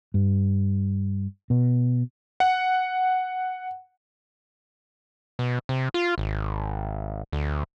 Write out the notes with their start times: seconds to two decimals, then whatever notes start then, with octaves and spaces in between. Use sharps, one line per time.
0.14 G2
1.50 B2
2.40 F#5
5.39 B2
5.69 C3
5.94 F4
6.18 G#1
7.32 D2